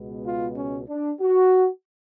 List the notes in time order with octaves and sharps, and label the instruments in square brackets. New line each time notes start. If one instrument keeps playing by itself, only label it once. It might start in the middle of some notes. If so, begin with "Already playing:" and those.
Already playing: [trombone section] C#2 B2 G#3 B3
F4
C#4
D4
F#4